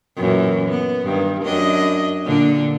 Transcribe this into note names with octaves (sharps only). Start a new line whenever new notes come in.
F#2 A#2 E3
B3
G2 D#3
F#2 D4 D#5
A#2 D3 D4